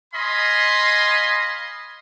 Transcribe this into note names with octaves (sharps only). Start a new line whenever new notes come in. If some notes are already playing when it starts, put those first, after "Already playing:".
D#5 F5 G#5 B5 C6